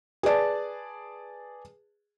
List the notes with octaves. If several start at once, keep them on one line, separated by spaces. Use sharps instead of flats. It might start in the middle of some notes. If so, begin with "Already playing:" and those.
G#4 B4 D5 A5